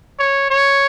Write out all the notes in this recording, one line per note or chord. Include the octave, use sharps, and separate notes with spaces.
C#5
C#5